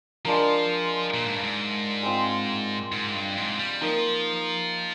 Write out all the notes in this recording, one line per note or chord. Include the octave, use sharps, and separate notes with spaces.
F3 G#3 D4 F4 A#4
A#2
G#2
G2
G#2
G#3 C4 F4
G#2
G2
G#2
G3
F3 A#3 D#4 A#4 D#5